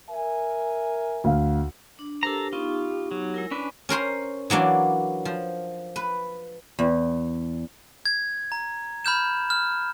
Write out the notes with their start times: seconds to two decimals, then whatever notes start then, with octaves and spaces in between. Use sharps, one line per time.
0.10 A#4 E5 G#5
1.24 D2 F5
1.99 D4
2.23 D4 G4 A4 A#4 C5 A#5
2.53 B3 D#4 F4 C#6
3.11 F#3
3.34 G#3 E4 A#4
3.51 C#4 D4 B4 G#5
3.89 C#4 A#4 C5 C6
4.50 E3 F#3 A#3 D4
5.25 F3
5.96 B4
6.79 E2
8.06 G#6
8.52 A#5
9.05 B5 F6 G6 E7
9.50 F6